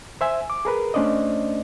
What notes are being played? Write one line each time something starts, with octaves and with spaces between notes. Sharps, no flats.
C5 E5 G#5
D6
G#4 A#4 B4
A3 C#4 D4 C5 D5 D#5